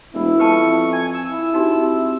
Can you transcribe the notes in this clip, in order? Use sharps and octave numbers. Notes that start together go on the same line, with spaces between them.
E1 E4
F2 B4 A5 C#6
G#5
E6
E4
C3 D#4 F#4